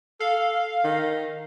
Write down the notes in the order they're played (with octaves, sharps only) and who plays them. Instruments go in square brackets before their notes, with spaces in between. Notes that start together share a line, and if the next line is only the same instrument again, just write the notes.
[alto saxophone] A4 [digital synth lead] F5
[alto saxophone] D#3